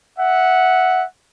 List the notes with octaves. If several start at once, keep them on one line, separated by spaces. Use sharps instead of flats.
E5 F#5